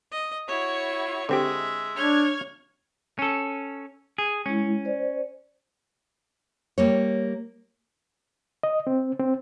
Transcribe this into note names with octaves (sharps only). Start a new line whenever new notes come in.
D#5
E4 F#4 C#5 C#6
D3 G#3 C4 G4 E5
D4 C#5 F6 G#6
C#4 A4
G#4
G#3 C#4 E4
C5 D5
G3 A#3 C#5
D#5
C4
C4